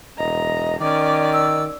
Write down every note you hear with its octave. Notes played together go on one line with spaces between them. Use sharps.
E1 D#5 A#5
D#3 C#4 D5 D6
E6